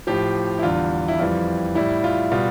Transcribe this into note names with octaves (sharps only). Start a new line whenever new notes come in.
A2 F3 G4
E4
E2 D3 G3 F4
E4
F2 E3 G3 F4
A2 G3 E4
F4
B2 G3 F4